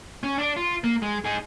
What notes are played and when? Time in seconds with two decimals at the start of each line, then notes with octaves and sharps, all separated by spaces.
0.23 C#4
0.38 D4 D5
0.56 F4
0.84 A#3
1.02 G#3
1.25 D#4 G#4